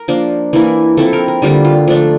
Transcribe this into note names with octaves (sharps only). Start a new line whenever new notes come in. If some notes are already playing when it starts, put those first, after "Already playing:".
Already playing: A#4
F3 A#3 D4
E3 A#3 E4
F3 C4 E4 A4
A#4
A#4
D3 G3 A#3 F4
F4
F3 A3 D4